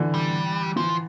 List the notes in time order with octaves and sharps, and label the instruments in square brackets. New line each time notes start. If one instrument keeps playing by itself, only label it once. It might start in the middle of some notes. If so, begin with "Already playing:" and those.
Already playing: [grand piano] D3 E3
[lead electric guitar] G3
[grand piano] E3 [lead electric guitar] F3